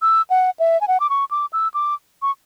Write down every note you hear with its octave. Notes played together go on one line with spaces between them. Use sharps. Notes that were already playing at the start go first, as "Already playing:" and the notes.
E6
F#5
E5
G#5
F#5
D6
C#6
D6
E6
D6
C#6